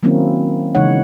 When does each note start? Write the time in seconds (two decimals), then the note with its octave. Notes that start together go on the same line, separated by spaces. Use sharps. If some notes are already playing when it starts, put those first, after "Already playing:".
0.03 D#3 F#3 A#3 C4 C#4 E4
0.75 C#3 E3 G#3 D#4 C#5 F#5